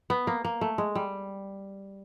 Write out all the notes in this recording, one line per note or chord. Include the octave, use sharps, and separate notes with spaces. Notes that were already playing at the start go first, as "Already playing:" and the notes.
B3
A#3
A#3
A3
G#3
G3